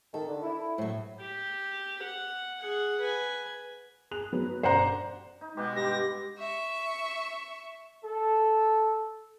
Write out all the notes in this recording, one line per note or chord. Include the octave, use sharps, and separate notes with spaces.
D#3 A4
D3
E4
A2 F#3
G4
F#5
G#4 F#5
B4 G#5
G#4 F#6 F7
F#3 B3 B4
G1 B2 C5 D5 F#5 A#5
D#4
B2 G#3 G4 D5 F#5
G2 G4 A#6
E5 C#6
A4